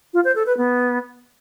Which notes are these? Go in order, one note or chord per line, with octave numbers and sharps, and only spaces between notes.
F4
C5
A4
B4
B3